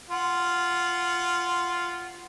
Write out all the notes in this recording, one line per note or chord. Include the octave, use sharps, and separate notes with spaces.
F4 F#5